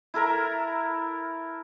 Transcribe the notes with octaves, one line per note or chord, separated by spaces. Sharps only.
E4 A4 A#4 A#5